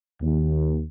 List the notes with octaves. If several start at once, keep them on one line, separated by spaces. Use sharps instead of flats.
D#2